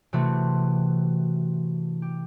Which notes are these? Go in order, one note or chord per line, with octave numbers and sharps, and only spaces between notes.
C3 E3 A3 C4 F#4
G4